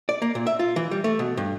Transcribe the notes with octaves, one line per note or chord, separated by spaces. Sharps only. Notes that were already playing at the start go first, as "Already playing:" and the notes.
D5
A#3
A#2
E5
F4
E3
G3
A3
B2
G2